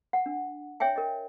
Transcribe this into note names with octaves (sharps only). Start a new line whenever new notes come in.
F#5
D4
C#5 E5 G5 G#5
A#4 D#5